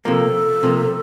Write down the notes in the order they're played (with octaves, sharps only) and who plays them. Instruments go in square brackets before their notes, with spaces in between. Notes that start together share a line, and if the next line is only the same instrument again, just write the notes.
[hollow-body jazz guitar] C3 F3 A#3 [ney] A4
[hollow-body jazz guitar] C3 F3 A#3